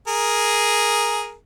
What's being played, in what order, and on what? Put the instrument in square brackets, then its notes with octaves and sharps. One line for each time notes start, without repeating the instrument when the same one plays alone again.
[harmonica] G#4 A#4